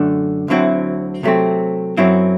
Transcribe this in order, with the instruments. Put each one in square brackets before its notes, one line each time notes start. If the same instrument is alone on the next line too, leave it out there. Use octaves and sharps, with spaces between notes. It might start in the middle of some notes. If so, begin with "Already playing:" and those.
Already playing: [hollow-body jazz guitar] F#2 D3 A3 D4
D2 D3 F#3 C4 E4
C3 F#3 A3 C4
F#2 F#3 C4 E4